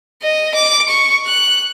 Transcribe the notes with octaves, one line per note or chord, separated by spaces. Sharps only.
D#5
D6
C#6
F#6